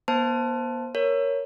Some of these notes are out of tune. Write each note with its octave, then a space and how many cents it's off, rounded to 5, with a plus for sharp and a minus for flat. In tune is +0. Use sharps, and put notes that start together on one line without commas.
B3 -45 C5 +0 A5 +0
A#4 +0 C#5 +0